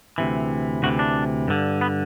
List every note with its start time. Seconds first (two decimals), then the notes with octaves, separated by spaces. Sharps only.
0.18 D2 C3 E3
0.83 D2 C3 E3 F#4
0.99 D4
1.48 G2 D3
1.81 B3